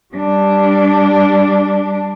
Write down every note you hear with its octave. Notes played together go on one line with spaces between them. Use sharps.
G3 D4